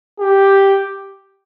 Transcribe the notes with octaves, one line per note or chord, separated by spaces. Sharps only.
G4